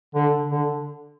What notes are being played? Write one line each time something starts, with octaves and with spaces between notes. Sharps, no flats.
D3
D3